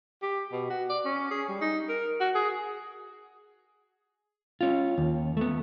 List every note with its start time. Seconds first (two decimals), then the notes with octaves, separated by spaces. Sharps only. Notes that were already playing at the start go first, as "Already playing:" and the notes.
0.22 G4
0.53 B2
0.70 F#4
0.90 D5
1.05 C#4
1.31 G#4
1.49 G3
1.61 D#4
1.89 A#4
2.21 F#4
2.35 G#4
4.61 C#4 F4
4.98 D#2
5.37 A3 B3